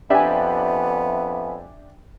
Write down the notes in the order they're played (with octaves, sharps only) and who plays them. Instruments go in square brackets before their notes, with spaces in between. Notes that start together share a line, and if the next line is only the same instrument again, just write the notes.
[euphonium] F2 [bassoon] B3 [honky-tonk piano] D4 G4 [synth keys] E5 G#5